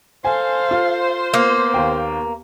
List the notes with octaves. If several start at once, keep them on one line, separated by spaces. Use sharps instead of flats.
A4 C5 F5 G#5
F4
A#3 B3
D#2 G5